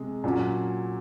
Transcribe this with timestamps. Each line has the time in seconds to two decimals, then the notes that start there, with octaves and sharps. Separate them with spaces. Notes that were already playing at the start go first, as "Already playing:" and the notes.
Already playing: C3 G#3
0.24 A#2 F#3 C#4